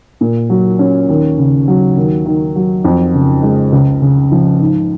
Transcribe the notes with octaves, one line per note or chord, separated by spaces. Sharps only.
A#2
F#3
C#4
D#2
C#3
F#3
D#2
D#3
F#3
F2
C#3
G#3
C#2
C#3
F3
G#2